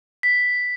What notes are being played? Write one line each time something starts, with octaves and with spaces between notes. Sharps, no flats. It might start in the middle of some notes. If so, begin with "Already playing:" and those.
B6